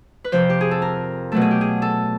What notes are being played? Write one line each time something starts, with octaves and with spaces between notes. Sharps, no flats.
B4
F2 C3 F3 C5
G4
G#4
A4
A#4
B2 F#3 A3 A4
G#4
G4
G#4
A4